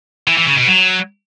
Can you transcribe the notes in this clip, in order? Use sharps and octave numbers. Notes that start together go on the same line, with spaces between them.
E3
E3
C#3
B2
F#3